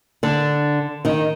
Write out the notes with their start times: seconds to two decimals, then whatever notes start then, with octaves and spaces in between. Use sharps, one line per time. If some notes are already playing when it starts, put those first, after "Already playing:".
0.23 D3 D4
1.05 D#3 D#4